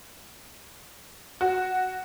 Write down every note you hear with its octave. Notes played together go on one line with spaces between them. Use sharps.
F#4